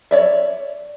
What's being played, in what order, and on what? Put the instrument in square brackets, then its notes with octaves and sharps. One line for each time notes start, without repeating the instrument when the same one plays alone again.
[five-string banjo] C#5 D5 E5